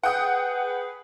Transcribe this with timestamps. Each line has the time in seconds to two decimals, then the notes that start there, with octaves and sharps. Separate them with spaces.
0.03 G#4 B4 F#5 G5 D#6